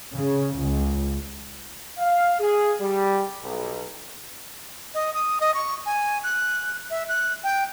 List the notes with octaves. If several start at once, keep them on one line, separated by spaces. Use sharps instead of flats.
C#3
C#2
F5
G#4
G3
B1
D#5
D#6
D#5
C#6
G#5
F#6
E5
F#6
G5